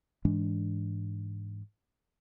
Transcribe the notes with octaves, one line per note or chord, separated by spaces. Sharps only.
G#2 E3 G#3 D4